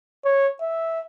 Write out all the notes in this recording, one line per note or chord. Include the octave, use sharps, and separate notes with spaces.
C#5
E5